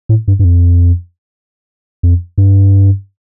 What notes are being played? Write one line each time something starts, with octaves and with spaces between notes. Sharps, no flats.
A2
G2
G2
F2
F2
G2